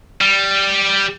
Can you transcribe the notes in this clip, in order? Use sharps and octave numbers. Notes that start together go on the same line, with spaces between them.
G3